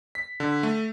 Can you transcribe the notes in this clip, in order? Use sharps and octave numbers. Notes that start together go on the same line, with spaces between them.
B6
D3
A3